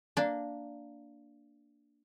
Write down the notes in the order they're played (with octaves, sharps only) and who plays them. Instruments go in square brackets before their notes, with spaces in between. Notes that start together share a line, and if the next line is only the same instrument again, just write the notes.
[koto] A#3 D4